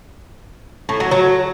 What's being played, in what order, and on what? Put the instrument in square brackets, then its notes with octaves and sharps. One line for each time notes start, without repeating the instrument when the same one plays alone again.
[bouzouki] A2
F#3
F#3